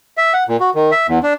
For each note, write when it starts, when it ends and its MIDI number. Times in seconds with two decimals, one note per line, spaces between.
0.17 0.33 76
0.33 0.44 78
0.48 0.57 46
0.60 0.70 66
0.75 0.91 51
0.92 1.07 76
1.08 1.19 40
1.23 1.33 62